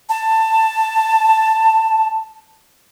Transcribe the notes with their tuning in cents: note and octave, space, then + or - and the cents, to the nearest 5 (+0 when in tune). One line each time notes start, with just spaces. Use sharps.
A5 +10